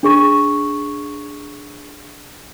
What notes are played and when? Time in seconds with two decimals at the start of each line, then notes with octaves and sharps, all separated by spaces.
0.03 D4 G#4 C#6